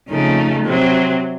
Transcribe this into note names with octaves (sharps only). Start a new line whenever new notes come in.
F2 C#3 A3 D#4
C3 F#3 C4